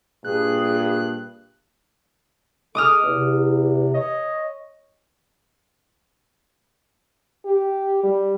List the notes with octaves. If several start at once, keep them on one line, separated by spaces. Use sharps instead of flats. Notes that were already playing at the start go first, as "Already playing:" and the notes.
G2 A#2 G#4 F#6
G#3 A4 D6 D#6 F6
E2 C3
C#5 D#5
G4
G3